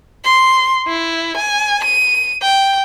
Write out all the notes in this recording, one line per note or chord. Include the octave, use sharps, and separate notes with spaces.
C6
E4
G#5
D#7
G5